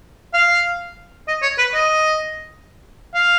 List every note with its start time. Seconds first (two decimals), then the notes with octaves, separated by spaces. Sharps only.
0.34 F5
1.28 D#5
1.43 C#5
1.58 B4
1.74 D#5
3.15 F5